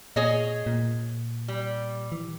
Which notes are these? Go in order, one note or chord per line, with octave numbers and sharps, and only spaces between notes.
A#2 G#4 C#5 D#5
A#2
G3
E3